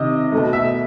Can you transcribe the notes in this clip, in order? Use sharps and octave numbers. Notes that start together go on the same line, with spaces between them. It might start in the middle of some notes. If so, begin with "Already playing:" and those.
Already playing: C3 D#3 D#5
B2 A3
E5